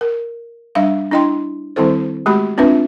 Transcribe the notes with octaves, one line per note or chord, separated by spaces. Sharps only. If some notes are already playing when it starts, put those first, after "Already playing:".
A#4
G3 D4 E5 F5
D4 E4 D#5 G5 C6
D#3 G3 C4 E4 A4 C5
G#3 A3 F#4 G4 B5
C4 D4 F4 B4 E5